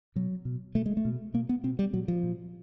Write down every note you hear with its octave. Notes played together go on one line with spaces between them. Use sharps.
B2 F#3
B2
B2 A3
G#3
A3
B2
B2 A#3
B3
B2 C4
G3
A#2 F#3
F3
A#2